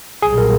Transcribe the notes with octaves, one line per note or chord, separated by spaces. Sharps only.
B1 A#2 G3 G#4
A#4